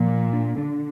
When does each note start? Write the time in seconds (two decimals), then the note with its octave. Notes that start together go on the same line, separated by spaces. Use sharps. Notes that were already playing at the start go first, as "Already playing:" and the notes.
Already playing: A#2 F3
0.08 A#3
0.33 D4
0.58 D3 D4